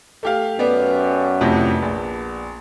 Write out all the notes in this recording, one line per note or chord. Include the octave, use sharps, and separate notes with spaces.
A3 G4 F5
F#2 B3 D5
F2 A2 C3
A#1